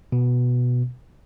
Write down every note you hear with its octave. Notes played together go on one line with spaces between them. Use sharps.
B2